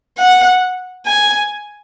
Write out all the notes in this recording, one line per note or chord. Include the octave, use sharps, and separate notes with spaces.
F#5
G#5